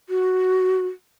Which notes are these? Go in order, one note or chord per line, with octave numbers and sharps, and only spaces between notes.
F#4